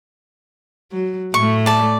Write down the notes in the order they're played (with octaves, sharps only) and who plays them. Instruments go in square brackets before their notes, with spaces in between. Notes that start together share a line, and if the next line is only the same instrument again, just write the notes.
[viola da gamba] F#3
[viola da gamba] A2 A3 [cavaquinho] C#6
[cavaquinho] D5 A5